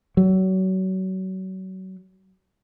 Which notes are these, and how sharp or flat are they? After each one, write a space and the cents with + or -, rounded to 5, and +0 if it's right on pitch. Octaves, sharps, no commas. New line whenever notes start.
F#3 +30